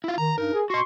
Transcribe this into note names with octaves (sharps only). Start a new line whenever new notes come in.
E4 F4
D#3 A#5
G2 D#4 A#4
G#4
F#4 D#5 C6 C#6